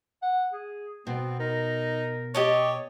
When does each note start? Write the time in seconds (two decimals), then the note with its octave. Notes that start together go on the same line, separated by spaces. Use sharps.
0.22 F#5
0.53 G#4
1.07 B2 B3 C4
1.39 D#4 A#4
2.35 G4 C#5 D#5 A5